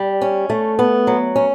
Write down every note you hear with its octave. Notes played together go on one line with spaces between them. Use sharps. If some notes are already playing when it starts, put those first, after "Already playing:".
Already playing: G3
C#4
A3
B3
F#3
C#4